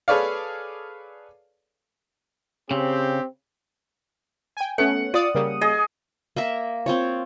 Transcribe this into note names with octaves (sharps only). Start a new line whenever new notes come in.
G#4 A4 B4 C#5 D5 F5
C#3 C4 G4
G5 G#5
A3 B3 C#4 F#5
F4 D5 D#6
C#3 G3 A#3
G#4 D#5
A#3 A#4 E5
C4 F4 C#5